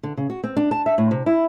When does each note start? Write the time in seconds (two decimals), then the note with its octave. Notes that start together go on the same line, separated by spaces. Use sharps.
0.03 D3
0.17 C#3
0.30 F#4
0.44 C4
0.57 D4
0.71 A5
0.86 E5
0.98 A2
1.11 C3
1.26 E4